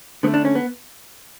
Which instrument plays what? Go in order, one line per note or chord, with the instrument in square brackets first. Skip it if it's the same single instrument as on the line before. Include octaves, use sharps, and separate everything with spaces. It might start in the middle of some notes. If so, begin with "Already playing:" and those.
[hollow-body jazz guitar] D3 B3
A3
D4
C#4
B3